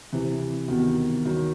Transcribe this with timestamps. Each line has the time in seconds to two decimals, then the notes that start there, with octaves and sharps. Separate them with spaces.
0.12 C3 E3
0.68 B2 D#3
1.25 D#3 F#3